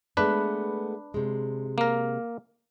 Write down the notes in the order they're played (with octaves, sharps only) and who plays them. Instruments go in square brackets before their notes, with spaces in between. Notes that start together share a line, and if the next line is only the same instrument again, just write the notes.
[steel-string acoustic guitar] G#3 A3 B3 [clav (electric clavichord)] D4 B4
[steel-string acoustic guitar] C3 G#3
[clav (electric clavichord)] A#3 A#4